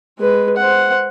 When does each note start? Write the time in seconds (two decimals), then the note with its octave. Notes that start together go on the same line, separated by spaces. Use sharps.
0.19 G#3 B4
0.57 C5 F#5